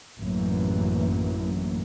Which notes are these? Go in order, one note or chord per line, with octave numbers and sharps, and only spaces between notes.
A1 F#2 D3 E3 F#3 A#3